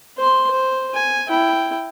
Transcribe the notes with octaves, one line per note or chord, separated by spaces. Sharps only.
C5 C6
C5
G#5
E4 G5